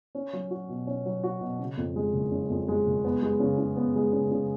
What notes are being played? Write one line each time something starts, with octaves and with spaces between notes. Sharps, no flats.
C#4
F#3
F#4
B2
C#4
F#3
F#4
B2
C#3
F2
G#3
F#1
C#3
F2
G#3
F#1
B3
G#3
C#3
C#3
B3
G#3
C#3
C#3